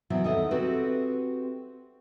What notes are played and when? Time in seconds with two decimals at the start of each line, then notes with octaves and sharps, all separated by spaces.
0.10 C3 E3 F#3 B3
0.24 D#2 A4 D#5 E5 F#5
0.51 C4 F#4 G4 A4 B4